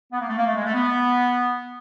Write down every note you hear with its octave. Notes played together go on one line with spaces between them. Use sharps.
B3
A#3
A3
A#3
A3
G#3
A3
B3